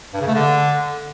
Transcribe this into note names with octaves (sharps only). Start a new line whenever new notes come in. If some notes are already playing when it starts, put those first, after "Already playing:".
G2
C#3
A3
D3